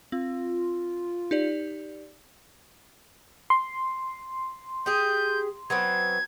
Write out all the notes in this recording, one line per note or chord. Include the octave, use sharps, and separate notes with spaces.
C4 F4
D#4 G4 D5
C6
G4 G#4 G6
F#3 B3 C4 G#6